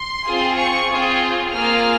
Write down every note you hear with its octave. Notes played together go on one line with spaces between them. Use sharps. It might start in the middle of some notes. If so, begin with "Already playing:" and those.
Already playing: C6
C4 F4 G#4
C#6
C4 F4 G#4
A#3 F4 G#4 F6